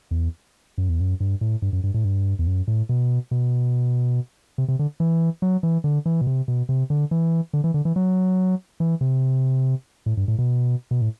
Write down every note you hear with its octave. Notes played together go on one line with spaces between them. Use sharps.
E2
F#2
E2
F#2
G2
A2
G2
F#2
G2
A2
G2
E2
F#2
A2
B2
B2
C3
C3
D3
E3
F#3
E3
D3
E3
B2
C3
B2
C3
D3
E3
D3
E3
D3
E3
F#3
E3
C3
A2
G2
A2
B2
B2
A2